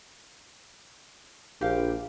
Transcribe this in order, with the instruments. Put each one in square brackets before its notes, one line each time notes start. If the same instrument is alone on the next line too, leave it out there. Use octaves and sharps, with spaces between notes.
[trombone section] A#1 [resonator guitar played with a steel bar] G4 F5